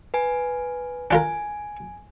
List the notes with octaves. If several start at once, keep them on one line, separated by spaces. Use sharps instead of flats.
B4 G#5
D4 F4 A#4 G#5